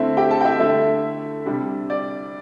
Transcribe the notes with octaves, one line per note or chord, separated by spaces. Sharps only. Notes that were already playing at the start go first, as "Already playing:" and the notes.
Already playing: D3 A3 C4 E4 E5
G4 G5
A4 A5
G5
E4 E5
D3 A3 E4 E5
C3 G3 D4
D5